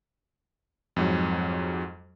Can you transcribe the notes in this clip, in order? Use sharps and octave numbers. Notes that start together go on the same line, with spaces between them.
F2 G#2 F#3